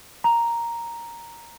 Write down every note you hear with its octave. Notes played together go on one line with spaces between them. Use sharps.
A#5